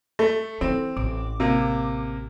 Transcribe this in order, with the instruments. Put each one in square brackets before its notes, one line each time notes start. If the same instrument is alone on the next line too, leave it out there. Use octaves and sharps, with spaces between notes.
[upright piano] A3 [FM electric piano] A4
[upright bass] E3 [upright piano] C4
[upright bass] A1 [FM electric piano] D6
[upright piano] C3 A#3